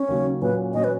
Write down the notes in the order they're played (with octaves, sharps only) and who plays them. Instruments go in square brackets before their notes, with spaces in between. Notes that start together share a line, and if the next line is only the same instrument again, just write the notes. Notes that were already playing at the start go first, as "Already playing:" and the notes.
Already playing: [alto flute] C#4
[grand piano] D#2 C#3 F#3
[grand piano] A#2 F#3 C#4 [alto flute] B4
[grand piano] A#2 F#3 C#4 [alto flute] D#5
[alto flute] B4